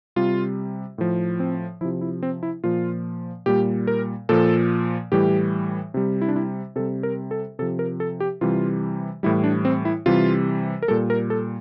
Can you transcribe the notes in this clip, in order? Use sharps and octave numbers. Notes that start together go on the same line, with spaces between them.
C3 G3 F4
A2 F3
C4
C3 F3 E4
E4
C4
E4
A#2 F3 F4
A#2 G3 G4
A#4
A#2 F3 A4
A2 E3 G3 G4
C3 G3
E4
D4
E4
C3 G3 A4
A#4
A4
C3 F3 A4
A#4
A4
G4
C3 E3 G3 F4
A2 E3 G3 E4
D4
C4
E4
C3 E3 G3 F4
A#4
A#2 G3 A4
A#4
A4